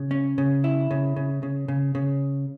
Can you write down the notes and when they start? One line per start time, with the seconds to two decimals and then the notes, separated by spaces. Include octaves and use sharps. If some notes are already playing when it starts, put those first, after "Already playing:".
Already playing: C#3
0.11 C#4
0.38 C#3
0.64 E4
0.91 C#3
1.16 C#3
1.43 C#3
1.68 C#3
1.95 C#3